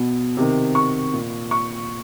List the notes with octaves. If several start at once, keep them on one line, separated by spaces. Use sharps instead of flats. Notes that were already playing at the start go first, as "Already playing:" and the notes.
Already playing: B2
C3 D#3
C#6
A#2
C#6